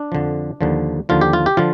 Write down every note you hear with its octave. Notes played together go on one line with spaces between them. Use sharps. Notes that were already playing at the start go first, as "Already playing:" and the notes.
Already playing: D4
F2 D3 F3
D#2 D3 F3
D#2 D3 F3 F4
G4
F4
G4
D3 F3 F4